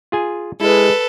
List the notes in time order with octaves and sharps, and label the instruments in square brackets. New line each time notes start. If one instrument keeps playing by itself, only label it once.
[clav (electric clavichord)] F4 G#4 G#5
[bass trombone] G#3 [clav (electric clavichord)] E4 [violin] A4 B4